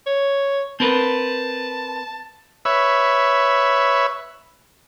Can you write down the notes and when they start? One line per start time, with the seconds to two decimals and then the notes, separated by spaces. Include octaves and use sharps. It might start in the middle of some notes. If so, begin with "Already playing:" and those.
0.06 C#5
0.80 C4 A#4 B4 A5
2.65 B4 C#5 E5